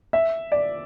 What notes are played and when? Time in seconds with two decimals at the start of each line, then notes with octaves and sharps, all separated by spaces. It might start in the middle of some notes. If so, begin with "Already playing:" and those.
0.13 E5
0.52 D5